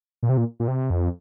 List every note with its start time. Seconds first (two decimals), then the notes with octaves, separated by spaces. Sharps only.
0.23 A#2
0.29 C3
0.37 A#2
0.60 A#2
0.68 C3
0.90 F2